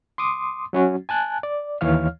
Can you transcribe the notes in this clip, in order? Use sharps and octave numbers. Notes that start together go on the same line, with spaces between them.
C6 D6 D#6
F#3 C#4 F#4
G#5 A5 F#6
D5
D#2 E3 C#5 F5 F6